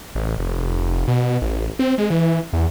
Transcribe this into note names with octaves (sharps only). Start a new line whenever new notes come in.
A1
F1
B2
A1
C4
G#3
E3
E2